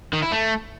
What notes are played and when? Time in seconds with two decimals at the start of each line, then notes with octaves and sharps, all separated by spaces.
0.13 D#3
0.22 E4
0.32 A3